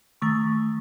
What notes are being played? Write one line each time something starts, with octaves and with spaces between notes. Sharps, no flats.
D#3 A3 C#6